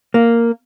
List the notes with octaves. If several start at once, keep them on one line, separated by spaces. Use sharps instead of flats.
A#3